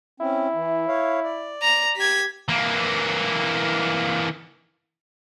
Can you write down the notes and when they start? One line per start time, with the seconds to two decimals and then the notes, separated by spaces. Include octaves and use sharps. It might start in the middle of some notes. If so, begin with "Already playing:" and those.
0.20 C4 C#4 E4
0.54 E3
0.88 C#5 F5
1.24 D5
1.62 A#5
1.97 G4 G#6 B6
2.49 E3 A#3